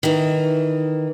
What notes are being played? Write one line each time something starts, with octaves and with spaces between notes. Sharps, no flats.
D#3 E3